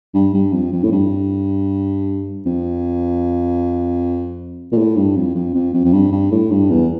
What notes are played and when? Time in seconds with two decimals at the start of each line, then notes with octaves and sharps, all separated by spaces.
0.14 G2
0.34 G2
0.53 F2
0.72 F2
0.83 A2
0.92 G2
2.46 F2
4.72 A#2
4.78 A2
4.96 G2
5.16 F2
5.35 F2
5.54 F2
5.73 F2
5.84 F2
5.93 G2
6.12 G2
6.31 A2
6.51 G2
6.70 E2